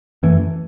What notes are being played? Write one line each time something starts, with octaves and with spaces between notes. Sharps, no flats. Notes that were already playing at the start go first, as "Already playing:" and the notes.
F#2 E3 A3